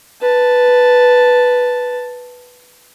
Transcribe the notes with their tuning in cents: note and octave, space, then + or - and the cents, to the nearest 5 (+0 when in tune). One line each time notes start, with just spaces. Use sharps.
B4 +0 A5 +0